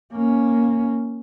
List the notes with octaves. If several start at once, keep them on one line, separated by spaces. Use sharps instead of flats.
A#3 C#4